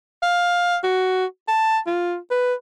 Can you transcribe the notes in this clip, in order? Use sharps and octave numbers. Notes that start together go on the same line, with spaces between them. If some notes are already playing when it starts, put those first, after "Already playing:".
F5
F#4
A5
F4
B4